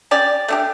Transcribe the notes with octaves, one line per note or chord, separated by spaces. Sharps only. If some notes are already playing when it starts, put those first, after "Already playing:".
C#4 G4 D5
A3 D4 G4